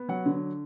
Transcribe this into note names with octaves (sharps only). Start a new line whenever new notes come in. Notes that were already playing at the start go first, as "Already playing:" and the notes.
Already playing: B3
F#3 F#5
D3